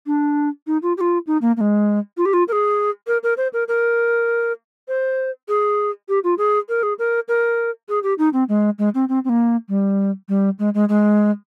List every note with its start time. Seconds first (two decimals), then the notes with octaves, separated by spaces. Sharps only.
0.06 D4
0.67 D#4
0.82 F4
0.97 G4
1.01 F4
1.27 D#4
1.41 A#3
1.57 A#3
1.61 G#3
2.17 F4
2.25 G4
2.33 F4
2.48 A#4
2.52 G#4
3.07 A#4
3.23 A#4
3.37 C5
3.53 A#4
3.68 A#4
4.88 C5
5.48 G#4
6.09 G4
6.24 F4
6.38 G#4
6.69 A#4
6.83 G#4
6.99 A#4
7.28 A#4
7.89 G#4
8.03 G4
8.18 D#4
8.33 C4
8.49 G#3
8.78 G#3
8.94 C4
9.09 C4
9.24 C4
9.29 A#3
9.69 G3
10.29 G3
10.59 G#3
10.74 G#3
10.89 G#3